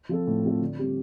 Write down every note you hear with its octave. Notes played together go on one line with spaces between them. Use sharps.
F3 C4 F4 A4
A2
F3 C4 F4 A4
D3
G3 C4 G4